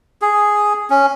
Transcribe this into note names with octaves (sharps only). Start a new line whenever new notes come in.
G#4
C#4